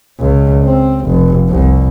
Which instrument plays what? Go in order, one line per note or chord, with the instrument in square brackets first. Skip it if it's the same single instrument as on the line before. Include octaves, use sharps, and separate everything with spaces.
[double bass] C#2
C4
F1
C2